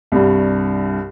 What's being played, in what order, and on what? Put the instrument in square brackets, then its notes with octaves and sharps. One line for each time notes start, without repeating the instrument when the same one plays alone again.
[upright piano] C2 G2